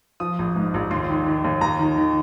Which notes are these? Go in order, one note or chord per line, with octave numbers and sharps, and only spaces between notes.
F3 D#6
A#1
G#2
A#1
D#2 C6
D#3
D#3
D#2
D#2 A#5
D#3
D#3